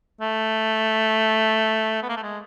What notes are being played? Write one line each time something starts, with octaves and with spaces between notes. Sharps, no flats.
A3
B3
A#3
A3
G#3